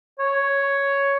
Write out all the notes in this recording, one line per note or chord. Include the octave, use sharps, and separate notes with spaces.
C#5